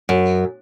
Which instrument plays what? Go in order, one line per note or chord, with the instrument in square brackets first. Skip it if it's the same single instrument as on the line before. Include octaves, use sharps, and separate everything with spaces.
[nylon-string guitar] F#2